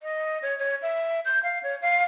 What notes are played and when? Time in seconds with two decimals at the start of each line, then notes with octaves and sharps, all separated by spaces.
0.03 D#5
0.42 C#5
0.59 C#5
0.82 E5
1.25 G6
1.43 F5
1.63 C#5
1.82 F5